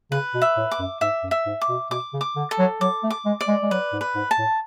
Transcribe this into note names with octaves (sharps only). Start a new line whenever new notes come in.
C#3 B4
B2
E5
A2
D6
F#2
G#2 E5
F#2
E5
G#2
D6
B2
B2 D6
C#3
D6
D3
A4
F#3
F#3 D6
A3
D6
G#3
D5
G#3
G#3
F#3 B4
G#2
B4
G#2
A5
A2